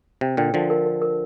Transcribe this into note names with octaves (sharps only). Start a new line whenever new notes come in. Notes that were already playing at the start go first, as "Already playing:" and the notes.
C3 G5
A#2 D3 G5
D3 F3 A#4
A#4
A#4
A#4